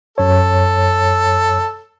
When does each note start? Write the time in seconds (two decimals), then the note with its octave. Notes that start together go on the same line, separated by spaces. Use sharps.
0.18 F#2 A4 C#5